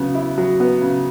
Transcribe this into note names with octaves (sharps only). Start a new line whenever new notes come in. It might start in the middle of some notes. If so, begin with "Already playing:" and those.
Already playing: C#3 F#3 B3
E4
F#3
B3
C#3